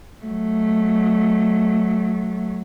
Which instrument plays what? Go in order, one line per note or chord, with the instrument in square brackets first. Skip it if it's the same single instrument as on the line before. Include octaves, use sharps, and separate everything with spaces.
[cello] F#3 A3